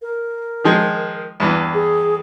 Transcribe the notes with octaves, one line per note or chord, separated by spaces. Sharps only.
A#4
D#3 F3 G#3
E2 G2 E3
G#4